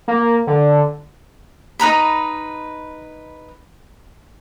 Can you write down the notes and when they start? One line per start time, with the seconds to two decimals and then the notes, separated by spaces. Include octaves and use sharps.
0.08 A#3
0.47 D3
1.79 D#4 B4 A#5 B5